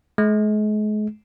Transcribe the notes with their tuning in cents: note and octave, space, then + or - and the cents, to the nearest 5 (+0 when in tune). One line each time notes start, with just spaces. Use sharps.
G#3 +40